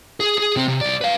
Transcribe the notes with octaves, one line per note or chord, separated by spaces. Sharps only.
G#4
G#4
C3 C4
C3
C2 D5
B4 F5